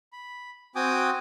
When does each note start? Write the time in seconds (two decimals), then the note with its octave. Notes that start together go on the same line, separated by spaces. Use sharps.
0.13 B5
0.75 C4 F#4 G5 G#5 D6 D#6